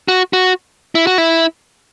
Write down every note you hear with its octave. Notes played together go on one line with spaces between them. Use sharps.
F#4
F#4
E4
F#4
E4